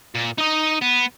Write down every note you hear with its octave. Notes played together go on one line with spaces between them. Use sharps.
A#2
D#4 D#5
B3